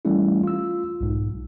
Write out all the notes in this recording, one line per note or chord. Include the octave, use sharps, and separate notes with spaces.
E3 G3 A3 C#4 E4
F4 E6
B1 G#2